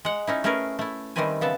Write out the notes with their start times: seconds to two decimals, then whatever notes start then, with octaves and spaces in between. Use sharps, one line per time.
0.05 G#3 F#5
0.27 C#4 D#4 E4
0.44 A3 C#4 E4 G#4 A#4 B4
0.79 A3 E4
1.16 D#3 G3 A3 C4 B4 G#5
1.41 C#3 B3 E5 A5